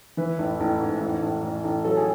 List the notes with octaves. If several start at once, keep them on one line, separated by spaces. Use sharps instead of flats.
E3 B4
A1
A1
G#2
A1
A1
A1
A1
F#3 A4
G#4